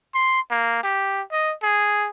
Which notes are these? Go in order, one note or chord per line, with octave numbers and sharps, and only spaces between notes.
C6
A#3
G4
D#5
G#4